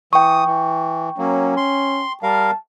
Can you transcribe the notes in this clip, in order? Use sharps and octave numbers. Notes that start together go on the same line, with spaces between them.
E3 G5 C#6 D#6
E3
F#3 A#3 C#4
C6
G3 A#4 F5 A5